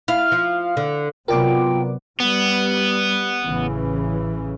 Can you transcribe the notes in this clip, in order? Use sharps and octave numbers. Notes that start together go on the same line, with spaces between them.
E4 F5 F6
F3
D3
C3 F#3 B3 F4 A#4 D5 G5 D6
G3 B3
A1 C#3 E3